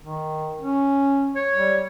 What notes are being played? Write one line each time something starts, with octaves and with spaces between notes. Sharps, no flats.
D#3
C#4
C#5
G3